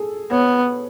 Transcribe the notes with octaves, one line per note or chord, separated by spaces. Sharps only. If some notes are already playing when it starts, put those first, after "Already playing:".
Already playing: G#4 A4
B3 C#5